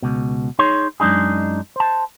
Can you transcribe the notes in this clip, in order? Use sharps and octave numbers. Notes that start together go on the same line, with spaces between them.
C#2 B2
D#4 G#4 C#5 C6
F#2 G#3 D4 D#4 G#4
C5 A5